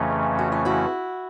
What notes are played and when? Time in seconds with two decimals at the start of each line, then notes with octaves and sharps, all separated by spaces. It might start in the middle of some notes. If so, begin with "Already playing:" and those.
Already playing: F2 C#3 E3 A3 C#4 D#4 F4
0.39 F#4
0.52 F4
0.65 E4 F#4